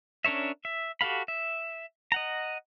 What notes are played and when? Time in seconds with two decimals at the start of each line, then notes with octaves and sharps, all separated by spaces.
0.25 C#4 D4 A#4 C#5 E5
0.65 E5
1.01 F#4 G4 A4 F5 B5
1.28 E5
2.12 D#5 F#5 A#5